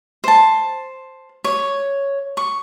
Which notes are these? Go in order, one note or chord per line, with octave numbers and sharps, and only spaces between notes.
C5 A5
C#5
C#6